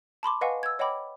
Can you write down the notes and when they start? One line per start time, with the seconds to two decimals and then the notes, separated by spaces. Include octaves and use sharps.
0.23 A5 B5 C6 D6
0.41 B4 D#5 F5 F#5 G#5 C#6
0.63 E6 G#6
0.79 C#5 D#5 F#5 G5 B5 D6